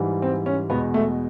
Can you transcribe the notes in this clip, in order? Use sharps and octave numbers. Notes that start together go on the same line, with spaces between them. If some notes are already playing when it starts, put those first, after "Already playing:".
Already playing: G#2 E3 G3
C4
C#4
E2 B2 G#3 B3
A3